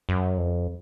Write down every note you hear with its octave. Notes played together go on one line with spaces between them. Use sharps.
F#2
F2